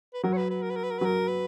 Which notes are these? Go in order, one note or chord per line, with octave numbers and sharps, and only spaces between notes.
B4
F#3 A#4
C#5
B4
B4
A#4
B4
A#4
B4
A#4
B4
F#3 A#4
B4